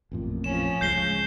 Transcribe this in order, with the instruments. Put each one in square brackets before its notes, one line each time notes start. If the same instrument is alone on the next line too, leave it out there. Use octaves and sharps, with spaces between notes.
[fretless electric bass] A1 F2 A#2
[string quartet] F3 C#4 [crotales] E7
[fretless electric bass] C#2 G#3 [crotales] G6 C7 G7